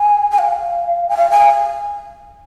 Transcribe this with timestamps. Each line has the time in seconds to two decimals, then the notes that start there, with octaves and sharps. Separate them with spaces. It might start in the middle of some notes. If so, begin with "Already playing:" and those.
Already playing: G#5
0.31 G#5
0.39 F5
1.09 G#5
1.17 F5
1.31 G#5